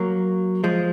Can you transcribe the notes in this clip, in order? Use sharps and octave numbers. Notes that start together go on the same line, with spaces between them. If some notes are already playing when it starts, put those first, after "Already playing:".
Already playing: F#3 A#3
F3 G#3